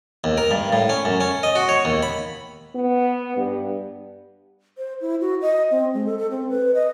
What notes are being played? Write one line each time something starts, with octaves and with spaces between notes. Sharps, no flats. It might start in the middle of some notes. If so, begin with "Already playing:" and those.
D#2
A#4
G2
A2
C#4
F#2
C#4
D#5
F#4
C#5
D#2
B5
B3
G2
C5
E4
F#4
D#5
C4
G#3
A4
A4
C4
B4
D#5